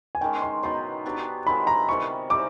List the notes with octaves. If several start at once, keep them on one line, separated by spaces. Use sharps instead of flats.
G#5
D#3 G#3 C#4 G5
C6
B2 F#3 B3 D#4 C6
F#3 B3 D4 G4
D#3 G#3 C4 F4 B5
A#5
C3 D#3 G3 B3 C#6
E3 G3 C4 D#4 D6